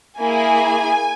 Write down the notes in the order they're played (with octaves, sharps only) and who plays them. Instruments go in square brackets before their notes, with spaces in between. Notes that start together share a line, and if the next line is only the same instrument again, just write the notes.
[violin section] A#3 E4 G#4 G#5